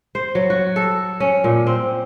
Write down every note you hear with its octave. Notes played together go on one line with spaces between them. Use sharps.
C5
F#3
F#4
A4
C#4
A#2
C4